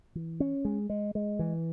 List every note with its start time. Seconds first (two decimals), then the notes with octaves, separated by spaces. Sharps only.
0.15 E3
0.40 C#4
0.65 G#3
0.90 G#3
1.15 G#3
1.39 E3